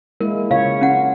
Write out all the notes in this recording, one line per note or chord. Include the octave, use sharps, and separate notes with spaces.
G#3 A#3 E4 A#4
C#3 F4 C#5 F5
C#4 F#5